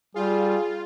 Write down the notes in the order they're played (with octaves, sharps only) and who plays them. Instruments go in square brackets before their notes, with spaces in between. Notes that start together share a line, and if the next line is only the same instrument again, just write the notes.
[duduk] G3 [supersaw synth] F4 [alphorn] G#4